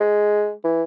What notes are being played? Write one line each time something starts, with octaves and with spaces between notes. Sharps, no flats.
G#3
E3